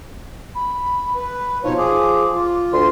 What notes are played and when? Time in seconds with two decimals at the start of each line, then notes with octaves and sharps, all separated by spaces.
0.55 B5
1.16 B4
1.64 B2 F3 D#4 C#5
1.78 G#4 D6
2.34 F4
2.73 D2 C6